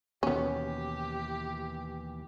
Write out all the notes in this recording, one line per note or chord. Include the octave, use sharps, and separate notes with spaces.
D#2 B2 E3 B3 C#4 G4